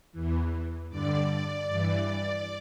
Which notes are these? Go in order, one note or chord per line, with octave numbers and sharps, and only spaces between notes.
E2 E3
G2 D3 D5
G2 E3